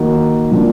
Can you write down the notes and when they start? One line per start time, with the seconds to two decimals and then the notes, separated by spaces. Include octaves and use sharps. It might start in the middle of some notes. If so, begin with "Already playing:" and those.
Already playing: D#3 A#3 D#4 F#4
0.51 F3 A#3 D4